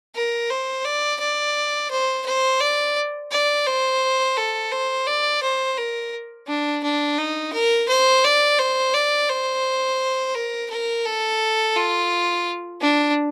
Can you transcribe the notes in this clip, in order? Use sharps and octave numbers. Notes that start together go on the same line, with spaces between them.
A#4
C5
D5
D5
C5
C5
D5
D5
C5
A4
C5
D5
C5
A#4
D4
D4
D#4
A#4
C5
D5
C5
D5
C5
A#4
A#4
A4
F4
D4